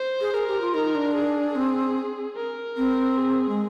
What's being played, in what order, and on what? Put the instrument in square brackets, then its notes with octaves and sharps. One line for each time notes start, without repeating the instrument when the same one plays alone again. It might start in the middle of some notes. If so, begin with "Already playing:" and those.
Already playing: [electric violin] C5
[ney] G#4
[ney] G#4 [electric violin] A#4
[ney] G4
F4
[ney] D#4 [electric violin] A#4
[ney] D4
[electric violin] G#4
[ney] C4
[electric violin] A#4
[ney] C4
[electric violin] G#4
[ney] G#3